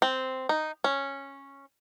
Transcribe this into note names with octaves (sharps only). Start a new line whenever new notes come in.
C4
D#4
C#4